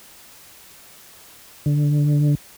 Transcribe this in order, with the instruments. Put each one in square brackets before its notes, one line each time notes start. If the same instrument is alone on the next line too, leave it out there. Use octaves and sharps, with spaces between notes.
[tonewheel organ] D3